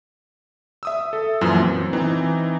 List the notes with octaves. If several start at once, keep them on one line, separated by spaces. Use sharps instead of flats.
E5 D#6 E6
A4
F#2 A#2 E3 F3
C4
E3 C4 D#4